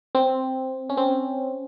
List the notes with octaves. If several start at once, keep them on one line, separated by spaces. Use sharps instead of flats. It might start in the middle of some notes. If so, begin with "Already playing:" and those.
C4
C#4
C4